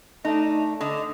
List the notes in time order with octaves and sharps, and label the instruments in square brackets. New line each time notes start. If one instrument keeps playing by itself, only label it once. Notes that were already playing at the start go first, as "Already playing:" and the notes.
[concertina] A3 [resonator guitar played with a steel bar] D4 D#4
[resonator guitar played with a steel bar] D3 [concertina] D#5